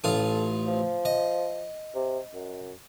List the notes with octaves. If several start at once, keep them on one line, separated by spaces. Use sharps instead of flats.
A1 F4 A4 D#6
F3
D#5
C3
F#2